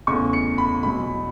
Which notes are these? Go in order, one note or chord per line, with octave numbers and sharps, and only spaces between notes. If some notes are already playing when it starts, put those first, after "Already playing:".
E2 C#3 A3 C#4 C#6
C#7
B5
E2 B2 F#3 B5